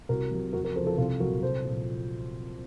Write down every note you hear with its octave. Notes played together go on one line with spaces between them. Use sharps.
C2 F#4 A#4
C3 F#3
F2 F#4 A#4
F#4 A#4
C#3 F3 A4 C5
F4 A4
C2 F4 A4
F#3 F#4 A#4
A#2
C2 A4 C5
A#2 F3